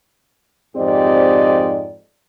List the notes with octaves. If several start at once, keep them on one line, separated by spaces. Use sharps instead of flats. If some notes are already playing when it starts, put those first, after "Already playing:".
F2 G#2 C4 G4 D5 D#5